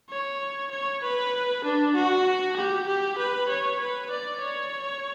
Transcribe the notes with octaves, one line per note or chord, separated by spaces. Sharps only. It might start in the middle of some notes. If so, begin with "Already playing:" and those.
C#5
C#5
B4
D4
F#4
G4
G4
B4
C#5
B4
D5
C#5